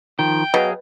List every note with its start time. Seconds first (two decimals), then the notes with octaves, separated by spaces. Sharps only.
0.19 D#3 F3 G5
0.54 B2 F#3 G#4 F5